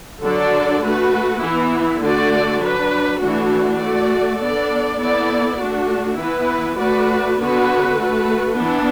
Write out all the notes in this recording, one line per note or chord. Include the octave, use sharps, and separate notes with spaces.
D3 F#3 D4 A4 D5
A3 F#4 B4
E3 B3 E4
D3 A3 F#4 D5
F#3 D4 B4
E3 A3 D4 F#4
A3 F#4 D5
B3 D4 A4 D5
B3 E4 A4 D5
A3 D4 F#4
E3 B3 E4 B4
A3 F#4 B4 D5
D3 B3 F#4 B4
A3 F#4 B4
E3 B3 D4